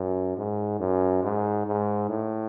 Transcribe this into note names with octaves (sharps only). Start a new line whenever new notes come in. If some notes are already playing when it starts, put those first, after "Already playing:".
Already playing: F#2
G#2
F#2
G#2
G#2
A2